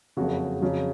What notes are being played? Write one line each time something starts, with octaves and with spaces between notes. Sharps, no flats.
F#1 F2 C#3 F#4
F2 C#3 F#3